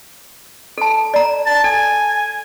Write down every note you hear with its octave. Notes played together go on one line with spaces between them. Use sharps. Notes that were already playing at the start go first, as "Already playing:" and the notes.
A4 A5
D5 A#5
A5
A4 G#5